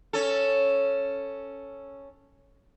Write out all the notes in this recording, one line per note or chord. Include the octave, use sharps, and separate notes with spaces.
C#4 A4